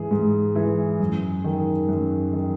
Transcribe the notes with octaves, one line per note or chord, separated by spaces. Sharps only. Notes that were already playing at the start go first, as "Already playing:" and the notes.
Already playing: G#2 E3 G#4
G#2
E3
F#2
D#3
F#2
D#3